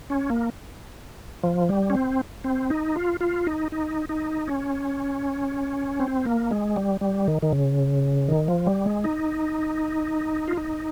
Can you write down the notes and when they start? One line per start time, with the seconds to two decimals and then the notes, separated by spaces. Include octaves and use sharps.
0.10 C#4
0.30 A#3
1.44 F3
1.69 G3
1.90 C#4
1.95 C4
2.44 C4
2.70 D#4
2.96 F4
3.21 F4
3.47 D#4
3.72 D#4
4.09 D#4
4.48 C#4
6.00 C4
6.26 A#3
6.51 G#3
6.76 G3
7.01 G3
7.28 D#3
7.42 D#3
7.52 C#3
8.28 D#3
8.48 F3
8.67 G3
8.86 G#3
9.04 D#4
10.48 F4
10.57 D#4